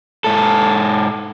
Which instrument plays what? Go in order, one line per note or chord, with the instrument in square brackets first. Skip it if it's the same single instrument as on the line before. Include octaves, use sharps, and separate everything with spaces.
[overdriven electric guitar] G#2 A4